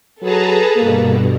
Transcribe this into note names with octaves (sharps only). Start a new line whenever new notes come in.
F#3 G#4 A4 B4 A5 A#5
G2 B2 A#3